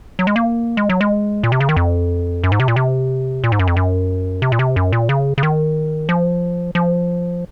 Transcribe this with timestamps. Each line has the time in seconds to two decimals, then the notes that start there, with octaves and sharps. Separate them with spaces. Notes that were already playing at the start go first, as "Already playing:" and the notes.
0.19 F#3
0.27 G#3
0.36 A#3
0.77 G#3
0.89 F#3
1.01 G#3
1.43 A#2
1.52 C3
1.60 C#3
1.69 D#3
1.77 F2
2.44 F#2
2.52 G#2
2.60 C3
2.68 A#2
2.76 C3
3.44 A#2
3.52 G#2
3.59 F#2
3.67 F2
3.76 F#2
4.42 C3
4.52 A#2
4.59 C3
4.76 F#2
4.93 A#2
5.09 C#3
5.38 C#3
5.43 D#3
6.09 F3
6.75 F3